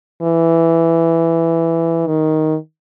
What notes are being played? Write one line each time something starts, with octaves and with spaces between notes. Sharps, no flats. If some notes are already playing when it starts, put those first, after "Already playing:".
E3
D#3